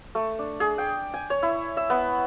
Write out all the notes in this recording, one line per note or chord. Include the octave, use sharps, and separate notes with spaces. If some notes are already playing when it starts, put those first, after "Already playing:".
A3
D4
G#4
G5
G#5
C#5
E4
E5
B3